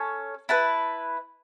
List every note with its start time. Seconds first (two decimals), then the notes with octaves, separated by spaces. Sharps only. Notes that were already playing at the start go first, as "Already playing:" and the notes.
Already playing: C#4 A4 C#5
0.49 E4 B4 A5